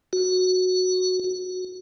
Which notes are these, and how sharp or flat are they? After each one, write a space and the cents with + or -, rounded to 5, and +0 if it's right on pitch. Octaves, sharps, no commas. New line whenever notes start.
F#4 -5
F#4 -10